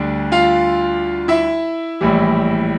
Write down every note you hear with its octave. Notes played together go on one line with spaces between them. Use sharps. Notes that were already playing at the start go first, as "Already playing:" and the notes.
Already playing: D2 D3 G3 D4
F4 F5
E4 E5
A#1 A2 E3 G3